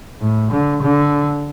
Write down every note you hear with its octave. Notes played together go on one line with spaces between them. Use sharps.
A2
D3
D3